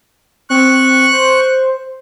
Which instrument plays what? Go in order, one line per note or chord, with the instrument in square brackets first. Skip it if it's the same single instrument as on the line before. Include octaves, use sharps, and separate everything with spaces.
[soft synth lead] C4 [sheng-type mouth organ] C#6 F#6
[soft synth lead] C5